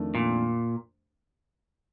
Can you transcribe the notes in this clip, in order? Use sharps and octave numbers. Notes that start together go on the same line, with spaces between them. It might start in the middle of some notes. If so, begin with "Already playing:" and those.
Already playing: F2 D#3 A3 D4
A#2